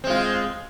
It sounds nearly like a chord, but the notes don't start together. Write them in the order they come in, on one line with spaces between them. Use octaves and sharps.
C4 G#3 F4